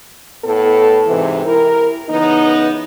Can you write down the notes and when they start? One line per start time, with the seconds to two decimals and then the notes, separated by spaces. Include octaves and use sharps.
0.44 A2 B3 A4
1.07 G#2 C3 E3
1.47 E4 A#4
2.09 C#3 E3 B3 D#4